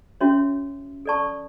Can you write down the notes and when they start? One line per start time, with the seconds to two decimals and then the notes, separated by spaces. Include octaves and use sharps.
0.21 C#4 F#4 C#5 E5
1.06 A4 D5 A5 C#6